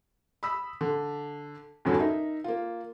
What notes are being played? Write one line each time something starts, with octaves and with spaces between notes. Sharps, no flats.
B5 D#6 E6 B6
D3
E2 G2 D3 F#3 C#4 D4
D#4 A#4 E5
A#3 F4